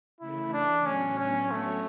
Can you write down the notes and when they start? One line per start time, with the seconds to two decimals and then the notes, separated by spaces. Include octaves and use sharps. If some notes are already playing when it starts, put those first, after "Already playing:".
0.20 C#3 E3 A3 E4
0.53 D4
0.86 A2 F#3 B3 C#4 D4
1.19 C#4
1.51 F#3 A3 C#4 F#4 C#5